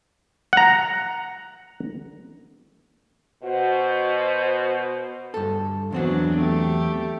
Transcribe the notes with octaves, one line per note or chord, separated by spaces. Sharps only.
F#5 A#5
B2 F#4 C5
G2 A4
E2 F#3 B3 C4 D4 F#4
A3 G4